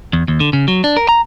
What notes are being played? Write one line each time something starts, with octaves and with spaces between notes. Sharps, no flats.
E2
D#2
D3
C#3
F#3
D4
A#4
A#5